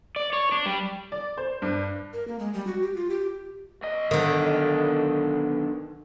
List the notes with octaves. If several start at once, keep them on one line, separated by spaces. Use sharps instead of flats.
D5
C#5
D4
G3
D5
C5
G2
A#4
A#3
G#3
G3
F#4
G4
F4
G4
B1 D#5
D3 D#3